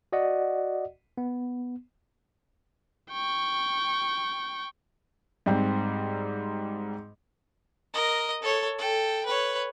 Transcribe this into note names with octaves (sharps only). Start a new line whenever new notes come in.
F#4 D5 D#5 F#5
B3
G5 C#6
G#2 G3 C4
A#4 D#5
A4 C#5
A4 G5
B4 C#5